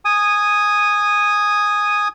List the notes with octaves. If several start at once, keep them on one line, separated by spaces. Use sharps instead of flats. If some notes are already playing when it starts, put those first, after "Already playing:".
G#5 D#6